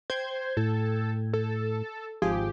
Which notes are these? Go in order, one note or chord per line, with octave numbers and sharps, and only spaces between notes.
C5 G5 G6 G#6
A2 A4
A4
G#1 F3 G4 G#4